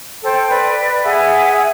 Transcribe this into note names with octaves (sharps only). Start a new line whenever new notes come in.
A4 C5 G5
B4 D5
G#4 E5 F#5 G#5